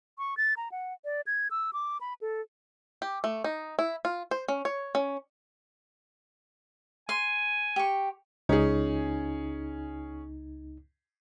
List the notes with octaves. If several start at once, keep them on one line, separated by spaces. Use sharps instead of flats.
C#6
A6
A#5
F#5
D5
G#6
E6
D6
B5
A4
G4
A3
D#4
E4
F4
C5
C#4
C#5
C#4
G#5 C6
G4 C#6
C#2 C#4 D#4 G#4